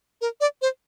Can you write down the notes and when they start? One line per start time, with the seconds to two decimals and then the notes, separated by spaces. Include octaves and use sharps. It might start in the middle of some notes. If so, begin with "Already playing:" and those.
0.21 A#4
0.41 D5
0.62 C5